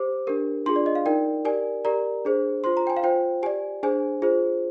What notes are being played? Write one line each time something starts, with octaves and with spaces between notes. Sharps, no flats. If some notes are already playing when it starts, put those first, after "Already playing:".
Already playing: G4 C5 D6
D4 G4 A#4
D4 F4 G#4 C6
D5
D#5
F5
D#4 A#4 D5 G5
G4 A#4 D5 G#5
G4 A#4 D5 A#5
D4 G#4 C5
F4 C5 C6
A#5
G5
G#5
F5
F4 C5 G5
G4 D5 G#5
D4 G#4 C5 G#5
F4 G#4 C5